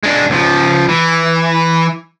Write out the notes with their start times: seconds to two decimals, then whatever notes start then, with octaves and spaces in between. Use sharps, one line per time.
0.03 G#3 D4
0.30 C#2 F3
0.89 E3